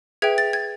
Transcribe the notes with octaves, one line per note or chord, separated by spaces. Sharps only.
G#4 B4 E5 G5 G#6
A6
G#6